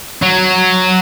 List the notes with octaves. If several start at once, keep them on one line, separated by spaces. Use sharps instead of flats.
F#3